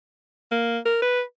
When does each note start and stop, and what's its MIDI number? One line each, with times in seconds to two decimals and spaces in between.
0.52 0.79 58
0.86 1.00 70
1.02 1.22 71